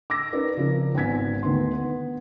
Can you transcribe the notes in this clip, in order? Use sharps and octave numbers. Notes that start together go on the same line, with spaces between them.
D6 E6 A#6
C#4 D#4 A#4 B4 D5
C#3 F3 C4 A#4
G#1 B3 G#5 G#6 B6
D2 D#3 B3 C6
B3